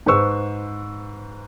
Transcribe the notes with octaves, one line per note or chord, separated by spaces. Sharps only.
G#2 B4 C5 C#6 E6